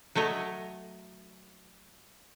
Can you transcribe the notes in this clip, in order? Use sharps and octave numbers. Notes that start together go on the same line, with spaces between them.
F#3 A3 C#5 D#5